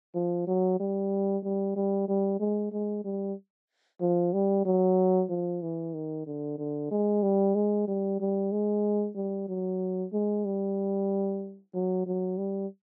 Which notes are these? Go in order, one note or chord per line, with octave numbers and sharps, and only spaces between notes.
F3
F#3
G3
G3
G3
G3
G#3
G#3
G3
F3
G3
F#3
F3
E3
D#3
D3
D3
G#3
G3
G#3
G3
G3
G#3
G3
F#3
G#3
G3
F#3
F#3
G3